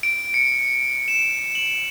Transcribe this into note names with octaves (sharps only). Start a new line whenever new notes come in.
D7
C#7
E7
F#7